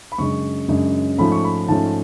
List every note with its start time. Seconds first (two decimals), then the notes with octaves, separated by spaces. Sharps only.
0.12 B5
0.18 F#2 C#3 G#3 D4 C#6
0.68 F#2 C#3 G#3 D4
1.18 G#2 F3 A3 C#4 B5
1.32 C#6
1.44 B5
1.68 G#2 F3 A3 C#4 A5